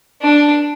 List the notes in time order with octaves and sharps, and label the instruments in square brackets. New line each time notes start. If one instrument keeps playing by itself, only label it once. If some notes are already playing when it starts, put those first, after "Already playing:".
[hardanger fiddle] D4